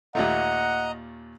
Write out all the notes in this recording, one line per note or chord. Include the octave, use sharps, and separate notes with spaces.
D#2 A#2 A3 D#5 F#5 A#5